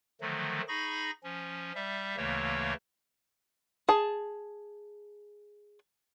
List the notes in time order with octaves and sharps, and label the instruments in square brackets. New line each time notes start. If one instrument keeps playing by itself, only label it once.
[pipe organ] D3 D#3 F3 F#3 A3
D#4 G#4 B5 C#6 A#6
F3 C#4
G3 E5
D2 C#3 E3 A3 A#3 C#5
[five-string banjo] G#4 A5